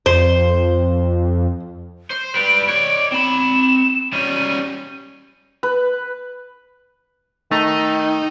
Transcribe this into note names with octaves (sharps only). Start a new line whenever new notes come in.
F2 C5
C5
G3 B4 D7
C#5 D5 D7
C4 B5 E7
G3 C#4 D#7
B4
D#3 A3 D#4